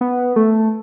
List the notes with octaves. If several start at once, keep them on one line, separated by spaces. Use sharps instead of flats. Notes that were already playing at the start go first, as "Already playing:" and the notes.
B3
A3